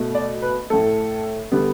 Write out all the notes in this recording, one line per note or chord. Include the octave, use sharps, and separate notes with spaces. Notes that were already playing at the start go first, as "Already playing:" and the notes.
Already playing: B2 A3
D5
B4
A2 A3 A4
D3 G3 B3